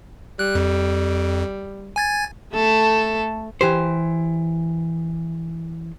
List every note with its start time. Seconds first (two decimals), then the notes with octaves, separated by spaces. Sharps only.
0.39 G3 F#6
0.55 F2
1.96 G#5 G#6 A6
2.54 A3 A4
3.61 E3 G4 C5